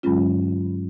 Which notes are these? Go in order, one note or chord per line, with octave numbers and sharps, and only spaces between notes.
G2 D3 F#3 G#3 C#4 F4